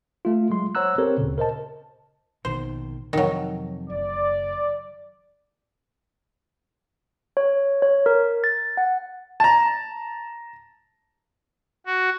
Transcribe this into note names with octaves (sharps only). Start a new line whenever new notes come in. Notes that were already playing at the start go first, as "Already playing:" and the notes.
A3 F4
F#3 G#3 C6
C5 C#5 F#5 A#5 E6 F#6
C4 G4 A4 A#4 C5 C#5
D2 A#2 C#3
A#4 C5 D#5 A5
A#1 B2 D#3 C5
F2 C3 D#3 F#3
F#1 D5
C#5
C#5
A#4
A6
F#5
A5 A#5
F#4